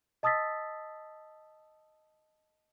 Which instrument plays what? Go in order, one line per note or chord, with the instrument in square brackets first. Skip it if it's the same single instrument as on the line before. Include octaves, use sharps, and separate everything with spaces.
[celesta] D#5 A5 D#6 E6 A6 B6